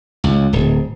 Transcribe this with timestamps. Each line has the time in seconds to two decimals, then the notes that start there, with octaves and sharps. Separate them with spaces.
0.24 C#2
0.53 D1